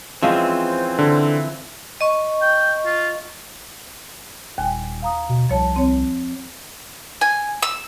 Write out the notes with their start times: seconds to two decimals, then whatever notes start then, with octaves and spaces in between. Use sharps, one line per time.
0.23 E3 F3 G#3 C4 C#4 C5
0.99 D3
2.01 D#5 C#6
2.41 G5
2.85 F4
4.58 D#1 D#2 G5 G#5
5.02 F5 A#5 D#6
5.29 B2
5.49 C2 F3 C#5 A5
5.76 C4 C#5
7.21 G#5
7.62 E6